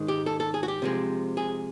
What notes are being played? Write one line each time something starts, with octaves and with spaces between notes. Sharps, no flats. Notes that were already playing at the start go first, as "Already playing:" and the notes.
Already playing: G#2 D#3 G#3
G4
A4
A4
G#4
F#4
G4
C3 F3 G#3
G#4